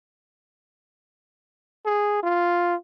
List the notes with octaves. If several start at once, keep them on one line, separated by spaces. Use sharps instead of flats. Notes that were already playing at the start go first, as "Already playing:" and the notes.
G#4
F4